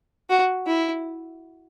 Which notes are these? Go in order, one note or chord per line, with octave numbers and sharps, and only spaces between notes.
F#4
E4